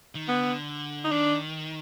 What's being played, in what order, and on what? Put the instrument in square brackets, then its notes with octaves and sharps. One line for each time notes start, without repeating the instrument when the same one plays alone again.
[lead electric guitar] D#3
[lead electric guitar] D3 [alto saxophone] B3
[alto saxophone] D#4
[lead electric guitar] D#3 [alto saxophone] D4